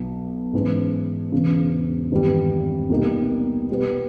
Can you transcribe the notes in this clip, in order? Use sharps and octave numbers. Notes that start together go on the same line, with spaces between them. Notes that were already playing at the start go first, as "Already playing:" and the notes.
Already playing: B1 B2 F#3
G#2 E3 G#3 C#4
E1 E2 C#3
G#1 G2 E3 G3
C2 B2 G3 A#3 D#4
B2 G3 B3